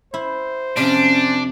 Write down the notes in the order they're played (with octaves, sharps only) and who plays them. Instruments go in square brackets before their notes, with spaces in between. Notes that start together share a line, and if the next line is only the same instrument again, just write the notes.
[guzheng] E4 [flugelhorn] C5
[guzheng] F2 C3 [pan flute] C#4 [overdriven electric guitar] D4